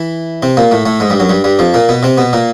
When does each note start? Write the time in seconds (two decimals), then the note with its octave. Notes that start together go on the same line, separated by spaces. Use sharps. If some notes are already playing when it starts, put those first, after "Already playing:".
Already playing: E3 E4
0.43 C3 C4
0.57 A#2 A#3
0.71 A2 A3
0.86 A2 A3
1.00 G#2 G#3
1.10 G2 G3
1.20 F#2 F#3
1.29 G2 G3
1.44 G2 G3
1.59 F2 F3
1.74 A#2 A#3
1.89 B2 B3
2.03 C3 C4
2.18 B2 B3
2.33 A#2 A#3